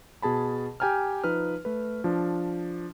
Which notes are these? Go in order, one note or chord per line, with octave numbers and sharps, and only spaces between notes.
B2 G#4 A5 B5
G4 G5 G#5 A#5 F6
F3 D#4 B4 F6
A3 B4
F3 D4